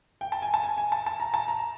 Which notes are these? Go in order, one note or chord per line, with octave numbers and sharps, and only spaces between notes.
G5
A5
G#5
A5
G#5
G#5
A5
A5
A#5
A5
A#5